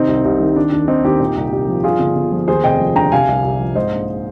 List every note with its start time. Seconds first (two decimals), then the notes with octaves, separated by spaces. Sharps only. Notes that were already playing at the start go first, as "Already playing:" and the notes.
Already playing: C3 D#3 C4 D#4
0.08 C2
0.25 C2
0.40 D#3
0.56 D#3 D4
0.72 D#2 D4
0.88 D#3 C4 D#4
1.04 D#2 D#4 G4
1.20 A#2
1.36 C2
1.52 C2
1.68 F3
1.84 G2 F4 G#4
1.99 G1
2.15 G1
2.32 F3
2.48 D#2 G#4 C5
2.64 F1 D#5 G5
2.80 F3
2.95 D3 G5 A#5
3.12 C3 F5 G#5
3.28 C2
3.44 C2
3.59 F3
3.75 G#2 C5 D#5
3.91 A#1